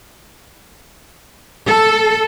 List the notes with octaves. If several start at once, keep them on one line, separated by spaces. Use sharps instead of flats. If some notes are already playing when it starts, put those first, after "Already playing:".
A4